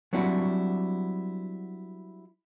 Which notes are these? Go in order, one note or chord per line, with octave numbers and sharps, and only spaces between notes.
F#3 G3 C4 D4 E4 F#4